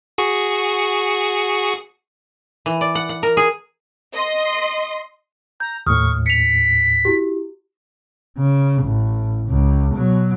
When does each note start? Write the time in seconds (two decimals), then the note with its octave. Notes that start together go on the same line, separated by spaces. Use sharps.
0.18 F#4 G#4 C#6
2.66 E3
2.81 D5
2.95 F#5
3.09 F#5
3.23 A#4
3.37 G#4
4.14 D#5 C6
5.60 A#5 G6
5.87 D#2 A2 C#6 D#6 F6
6.26 B6 C#7 F7
7.05 E4 F#4 G4
8.38 C#3
8.83 A1
9.48 C#2
9.95 B2 F#3